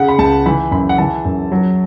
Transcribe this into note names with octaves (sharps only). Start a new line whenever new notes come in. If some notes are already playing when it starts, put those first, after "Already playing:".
Already playing: C#3 F#5
B5
C#2 A5
E3 B5
F#2 B5
F#5
E3 A5
F#2
F#3